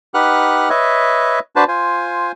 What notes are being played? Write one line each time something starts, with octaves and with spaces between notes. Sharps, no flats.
D#4 G4 B4 F#5 F6 F#6
B4 C#5 D#5 E5
D4 F#4 B4 C5 A5
F4 C5 G#5